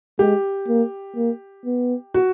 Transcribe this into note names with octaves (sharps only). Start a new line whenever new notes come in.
G#3 G4
A#3
A#3
B3
F#4